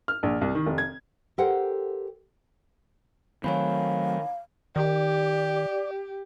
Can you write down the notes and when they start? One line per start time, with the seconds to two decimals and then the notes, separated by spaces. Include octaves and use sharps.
0.08 F6
0.23 A#1
0.41 C2
0.55 D#3
0.67 F1
0.78 G#6
1.38 G4 A4 A#4 C5 F#5 G5
3.44 D#3 F#3 A3 C4 C#5 F5 G#5 B5
4.76 D#3 G4 D5